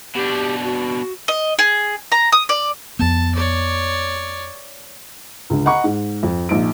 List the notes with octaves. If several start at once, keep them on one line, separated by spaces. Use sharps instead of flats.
B2 D4 G4
F#4
D#5
G#4
A#5
D#6
D5
F2 B3 A5
C#5 D5
C#2 D3
D#5 F#5 A#5 B5 C#6
G#2
F2
A#1 D#4 D7